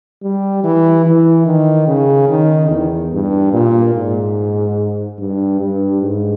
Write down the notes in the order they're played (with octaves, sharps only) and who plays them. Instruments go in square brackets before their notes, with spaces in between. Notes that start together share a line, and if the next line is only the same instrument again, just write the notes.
[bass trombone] G3
E3
E3
D#3
C#3
D#3
E2
G2
A#2
G#2
G2
G2
G#2